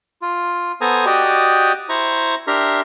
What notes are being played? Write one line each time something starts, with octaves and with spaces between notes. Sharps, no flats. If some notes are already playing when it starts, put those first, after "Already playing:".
F4
B3 A4 C5 G#5 A#5 D#6
F#4 G4 D5 D#5 G5 D#6
E4 C5 A#5 C#6
D4 G4 A#4 E5 A#5 C6